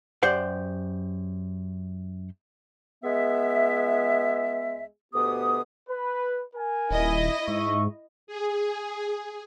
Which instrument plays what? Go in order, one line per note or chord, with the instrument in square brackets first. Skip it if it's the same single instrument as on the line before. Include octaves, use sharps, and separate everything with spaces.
[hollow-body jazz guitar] F#2 G4 C5 D5 F#5
[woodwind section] C#2 G#3 B3 E5
D2 B2 B3 G4 D#6
[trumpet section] B4
A#4 G#5
[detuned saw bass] D#1 [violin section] E4 D#5
[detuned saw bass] G#2 [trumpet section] E5 C#6
[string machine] G#4